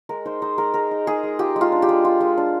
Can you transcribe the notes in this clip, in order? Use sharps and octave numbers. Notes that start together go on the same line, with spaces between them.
G#3 A#4
D#4 C5
D#4 C5
G#3 A#4
G#3 A#4
D#4
D#4 G#4
G#3
F4 G4
G#3
F4
D4
G4
G#3
F4
G#3
D4